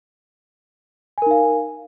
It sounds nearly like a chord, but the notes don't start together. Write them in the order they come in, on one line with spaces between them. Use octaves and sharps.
G#5 A#4 D#4 F5